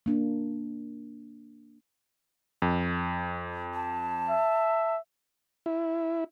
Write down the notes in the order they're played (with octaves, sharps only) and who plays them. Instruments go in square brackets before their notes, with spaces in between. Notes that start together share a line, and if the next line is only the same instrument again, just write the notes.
[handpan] A#3 D4
[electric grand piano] F2
[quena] A5
[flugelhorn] E5
[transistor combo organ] E4